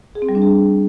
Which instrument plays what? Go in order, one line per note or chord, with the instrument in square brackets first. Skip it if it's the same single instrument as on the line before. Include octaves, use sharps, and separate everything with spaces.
[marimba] G#4
C4
G3
D4
G#4